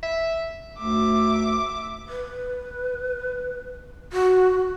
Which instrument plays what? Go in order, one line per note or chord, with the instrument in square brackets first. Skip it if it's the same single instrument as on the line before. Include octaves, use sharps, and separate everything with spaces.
[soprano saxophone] E5
[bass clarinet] D2 [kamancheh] E5 D6
[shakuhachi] B4
F#4